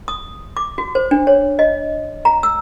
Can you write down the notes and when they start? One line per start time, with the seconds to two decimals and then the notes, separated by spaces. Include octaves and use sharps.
0.08 D#6
0.57 D6
0.78 F#4
0.95 C5
1.11 D4
1.27 C#5
1.59 D#5
2.25 A#5
2.43 E6